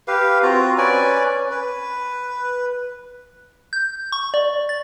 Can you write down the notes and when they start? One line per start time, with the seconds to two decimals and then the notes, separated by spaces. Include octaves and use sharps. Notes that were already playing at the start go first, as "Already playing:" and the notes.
0.08 G4 B4 F5
0.43 C4 F4 F#4 A#5
0.78 C#4 B4 D5 G#5
1.51 B4
3.73 G6
4.12 C#6
4.34 D5
4.69 A6